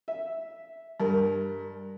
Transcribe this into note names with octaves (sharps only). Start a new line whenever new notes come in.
E5
G2 A#4